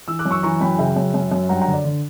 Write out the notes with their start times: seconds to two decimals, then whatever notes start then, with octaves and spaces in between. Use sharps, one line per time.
0.08 E3 E6
0.19 D6 F#6
0.25 F#2
0.31 C#6 E6
0.43 E3 A#5 C#6
0.61 F#2 G5 B5
0.78 C#3 E5 G5
0.96 F#2
1.14 F#2
1.32 F#2
1.49 G2 F#5 A#5
1.56 G5
1.61 F#5 A#5
1.67 D3
1.73 D5
1.85 D3